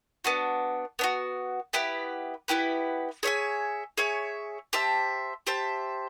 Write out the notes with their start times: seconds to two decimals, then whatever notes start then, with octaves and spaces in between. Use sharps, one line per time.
0.24 B3 D4 F#4
0.99 B3 D4 F#4
1.73 B3 E4 G4 B4
2.48 B3 E4 G4 B4
3.23 G#4 C#5 E5 G#5
3.98 G#4 C#5 E5 G#5
4.73 G4 C5 E5 A5
5.47 G4 C5 E5 A5